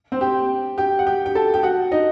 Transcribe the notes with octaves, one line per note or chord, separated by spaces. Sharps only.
C4 C5
G4 G5
G4 G5
F#5
G4 G5
G4 G5
A4 A5
G4 G5
F#4 F#5
D#4 D#5